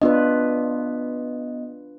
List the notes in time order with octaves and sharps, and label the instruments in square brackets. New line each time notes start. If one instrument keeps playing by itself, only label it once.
[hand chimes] B3 D#5 [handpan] D4 F4 B4